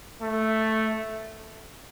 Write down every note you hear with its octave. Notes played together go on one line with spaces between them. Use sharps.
A3